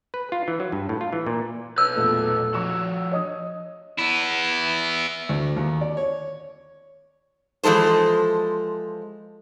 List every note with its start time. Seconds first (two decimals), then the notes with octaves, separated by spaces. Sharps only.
0.14 B4
0.32 F4
0.48 E3
0.60 F#3
0.72 G2
0.89 A2
1.01 F4
1.13 E3
1.27 A#2
1.78 B1 B4 C#5 E6 F6
1.96 E2 A#2 A3
2.54 F3 F#4 C#6 E7
3.12 C#5 D#5 D#6
3.98 B3 E4
5.29 D2
5.56 D#2
5.81 D5
5.97 C#5
7.63 E3 F3 G#3 A4 C5